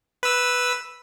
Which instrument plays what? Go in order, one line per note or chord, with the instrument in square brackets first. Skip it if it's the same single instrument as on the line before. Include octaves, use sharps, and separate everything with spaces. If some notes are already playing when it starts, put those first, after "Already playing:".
[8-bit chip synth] B4 E6